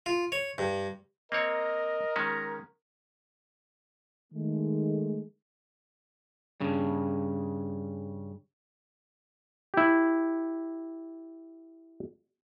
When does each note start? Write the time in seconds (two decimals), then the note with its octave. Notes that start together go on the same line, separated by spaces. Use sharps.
0.06 F4
0.32 C#5
0.58 G2
1.32 A#3 C4 A#4 C#5 D#5
2.16 D#3 G#3 C#4 A#5
4.33 D#3 G#3 A3
6.61 G2 C#3
9.74 E4 G4